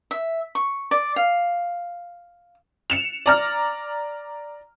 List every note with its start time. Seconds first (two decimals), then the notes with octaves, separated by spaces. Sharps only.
0.11 E5
0.55 C#6
0.91 D5
1.16 F5
2.90 C#7 E7 F7
3.26 D5 A#5 F6